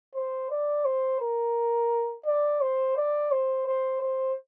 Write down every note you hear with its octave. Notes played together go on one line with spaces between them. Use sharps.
C5
D5
C5
A#4
D5
C5
D5
C5
C5
C5